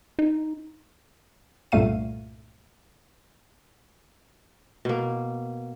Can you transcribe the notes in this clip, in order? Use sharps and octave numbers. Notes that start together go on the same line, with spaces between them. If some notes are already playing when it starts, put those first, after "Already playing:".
D#4
C2 G2 A#2 A3 F5 D#7
B2 A#3